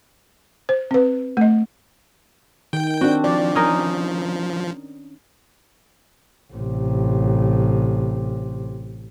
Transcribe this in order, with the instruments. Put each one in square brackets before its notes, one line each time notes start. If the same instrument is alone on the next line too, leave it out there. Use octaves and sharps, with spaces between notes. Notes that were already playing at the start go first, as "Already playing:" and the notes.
[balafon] C5
C4 B4
A3 D#5
[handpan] D#3 [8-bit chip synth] G5
[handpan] C4 D4 [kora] F#4
[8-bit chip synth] F3 [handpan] D5
[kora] C#4 D#4 A#4
[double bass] A1 C3